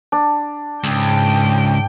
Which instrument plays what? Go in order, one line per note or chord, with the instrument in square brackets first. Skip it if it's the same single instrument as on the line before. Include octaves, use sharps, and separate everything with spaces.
[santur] D4
[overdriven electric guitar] C#2 [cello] G#2 G5